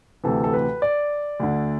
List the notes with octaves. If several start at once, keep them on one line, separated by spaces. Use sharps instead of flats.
D2 C3 E3 A4
A4
B4
D5
D2 D3